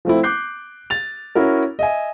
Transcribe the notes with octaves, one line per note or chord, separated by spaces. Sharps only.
F3 A3 C4 E4
D6 F#6 G6 C7
A6 F7
C#4 E4 F#4 A#4
D#5 E5 G#5